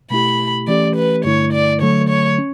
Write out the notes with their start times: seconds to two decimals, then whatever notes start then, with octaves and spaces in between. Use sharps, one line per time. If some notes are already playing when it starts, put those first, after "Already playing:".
0.10 B2 A3 E4 G4 B5
0.67 E3 A3 C#4 G4 D5
0.96 B4
1.25 G2 D3 A3 E4 C#5
1.53 D5
1.81 D3 F#3 A3 C#5
2.09 C#5
2.39 C#4